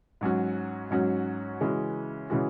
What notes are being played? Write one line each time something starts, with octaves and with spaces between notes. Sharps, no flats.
G#2 F#3 C#4 F#4
G#2 F#3 C#4 F#4
C#3 E3 G#3 C#4 F#4
C#3 E3 G#3 C#4 F#4